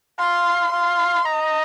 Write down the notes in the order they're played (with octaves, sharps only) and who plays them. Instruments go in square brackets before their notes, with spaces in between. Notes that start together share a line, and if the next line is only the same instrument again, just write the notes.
[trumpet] F5 [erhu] C6
[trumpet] F5 [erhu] C6
[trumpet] D#5 [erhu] A#5